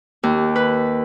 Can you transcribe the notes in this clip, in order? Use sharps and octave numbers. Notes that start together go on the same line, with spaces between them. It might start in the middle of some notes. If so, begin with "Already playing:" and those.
D#2
B4